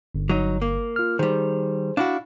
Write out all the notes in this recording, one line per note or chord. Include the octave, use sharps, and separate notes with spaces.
G1
F#3 D#4
A#3
F4 F6
D#3 G3 G#4 C5
D4 E4 F#4 F5